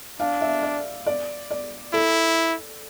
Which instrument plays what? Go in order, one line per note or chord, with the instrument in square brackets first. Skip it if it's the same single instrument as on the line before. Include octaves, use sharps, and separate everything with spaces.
[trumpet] D4 [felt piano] F5
[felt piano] E5
D5
D5
D5
[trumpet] E4 [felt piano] A4